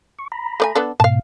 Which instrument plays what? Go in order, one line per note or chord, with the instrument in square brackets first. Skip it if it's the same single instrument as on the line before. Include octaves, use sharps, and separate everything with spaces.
[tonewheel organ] C#6
A#5 B5
[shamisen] A3 D5 G#5
B3 D4 A4
[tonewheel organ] G#2 B2 [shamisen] F5 A5